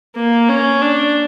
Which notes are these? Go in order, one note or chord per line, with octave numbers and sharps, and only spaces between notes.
A#3
C#4
D4